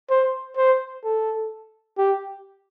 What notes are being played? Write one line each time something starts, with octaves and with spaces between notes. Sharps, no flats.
C5
C5
A4
G4